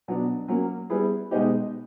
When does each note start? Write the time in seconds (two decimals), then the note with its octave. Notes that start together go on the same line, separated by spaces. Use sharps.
0.08 B2 F#3 B3 D4
0.48 F#3 A#3 C#4
0.90 G3 B3 E4 G#4 B4
1.31 B2 G#3 B3 D#4 G4